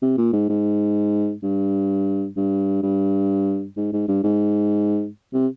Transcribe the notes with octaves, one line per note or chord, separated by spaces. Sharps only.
C3
A#2
G#2
G#2
G2
G2
G2
G#2
G#2
G2
G#2
C3